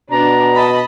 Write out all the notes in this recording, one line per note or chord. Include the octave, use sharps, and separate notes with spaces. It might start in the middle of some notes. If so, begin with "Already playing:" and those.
B2 D4 A#5
D#5 A5 B5